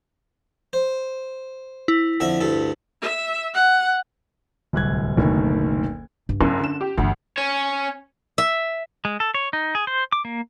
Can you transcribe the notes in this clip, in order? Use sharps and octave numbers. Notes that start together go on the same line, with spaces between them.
C5
E4
F2 D3 E5
D2 G2 A4
E5
F#5
D1 C2 F#6 G#6
F#1 D2 B2 D#3
G2
F#1 F#2 C#4
D3 E7
G4
G1 D2 E3
C#4 C#5
E5
G#3
A4
C#5
D#4
G#4
C5
D6
A#3